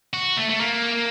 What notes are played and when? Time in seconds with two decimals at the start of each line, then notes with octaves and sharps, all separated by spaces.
0.13 F#4
0.37 A3
0.49 A3
0.60 A#3